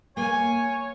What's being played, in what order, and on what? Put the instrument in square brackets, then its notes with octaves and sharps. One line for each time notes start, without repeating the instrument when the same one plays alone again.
[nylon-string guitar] A#3 [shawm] C#5 [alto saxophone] G#5